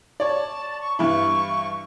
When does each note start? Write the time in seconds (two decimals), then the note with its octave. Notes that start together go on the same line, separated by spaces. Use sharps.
0.20 C#5 D5 A5
0.81 C#6
0.99 G2 E3 E4 C#6